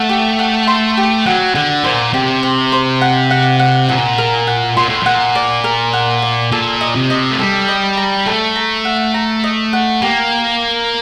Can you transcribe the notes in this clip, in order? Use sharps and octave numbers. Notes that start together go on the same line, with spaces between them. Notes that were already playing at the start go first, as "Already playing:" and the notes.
Already playing: A3 F#5
G4
F#5
C6
G4
F#3 F#5
D3 F#5
A#2 C5
C3 G4
C5
C5
F#5
F#5
F#5
A#2 F#5
A#4
F#5
A#2 C6
A2
A#2 F#5
D5
A#4
F#5
D5
A#2 A4
D#5
C3
D#5
A3
G3 A4
D#5
A#5
A3 A4
A#5
F#5
A#5
D#5
F#5
A#3 G4